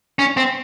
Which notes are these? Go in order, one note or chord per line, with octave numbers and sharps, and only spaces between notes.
C#4
C4